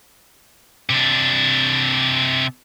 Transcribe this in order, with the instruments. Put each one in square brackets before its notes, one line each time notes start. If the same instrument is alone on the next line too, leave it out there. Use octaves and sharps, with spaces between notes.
[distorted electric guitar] C3 D4